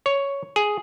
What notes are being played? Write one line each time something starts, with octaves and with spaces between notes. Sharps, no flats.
C#5
G#4